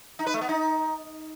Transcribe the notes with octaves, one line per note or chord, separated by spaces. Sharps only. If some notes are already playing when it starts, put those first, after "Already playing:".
D#4
B4
A3
B3
D#4